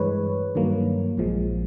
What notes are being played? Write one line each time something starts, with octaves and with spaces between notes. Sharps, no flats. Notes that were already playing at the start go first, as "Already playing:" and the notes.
Already playing: G2 E3 G#3 B4 C#5
G2 D#3 F#3 A#3
A#1 A#2 F3 G#3